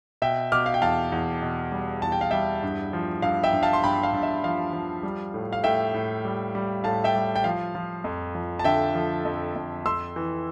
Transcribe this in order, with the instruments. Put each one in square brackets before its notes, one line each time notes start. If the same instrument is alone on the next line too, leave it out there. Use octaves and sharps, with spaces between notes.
[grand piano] B2 E5 G5
B2 D6 F6
F5
G5
E2 F5 A5
E2
B2
G3
E2 A5
G5
F5
G3 E5 G5
G2
F3
G2 F5
E5 G5
G2
F5 A5
C6
G2 G5 B5
F5
G2
E5
F3 F5
F3
G3
A2
F5
A2 E5 G5
A2
G3
G3
A2 F5 A5
E5 G5
G3
G5
F3 F5
F3
F2
F3
A5
D3 E5 G5
F3
F2
F2
F2 C6 E6
E3